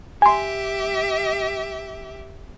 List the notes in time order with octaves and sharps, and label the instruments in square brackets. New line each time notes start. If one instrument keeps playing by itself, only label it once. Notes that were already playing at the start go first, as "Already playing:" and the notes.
[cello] G4 E5 [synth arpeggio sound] G#5 C6